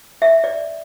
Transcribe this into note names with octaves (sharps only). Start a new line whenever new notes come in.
E5
D5